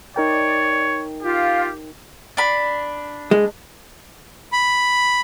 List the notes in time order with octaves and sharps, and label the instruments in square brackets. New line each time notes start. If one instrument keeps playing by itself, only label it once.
[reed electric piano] D#4 A#4 G5 [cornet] C#5 [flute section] D5
[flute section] F4 [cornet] G4
[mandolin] D4 B5
[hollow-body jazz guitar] G#3
[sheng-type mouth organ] B5